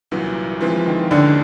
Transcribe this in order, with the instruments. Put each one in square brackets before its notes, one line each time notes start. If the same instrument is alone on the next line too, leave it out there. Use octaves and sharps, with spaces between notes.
[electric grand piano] C2 A#2 F#3 [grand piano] E3
[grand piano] E3 [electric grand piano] F3 G#3 C4 F4
[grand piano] D#3
[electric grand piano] D#2 D#3 G#3 C#4 [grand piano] D3